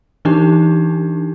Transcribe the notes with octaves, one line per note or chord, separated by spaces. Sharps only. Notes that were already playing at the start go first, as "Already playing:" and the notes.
E3 D4 D#4 G4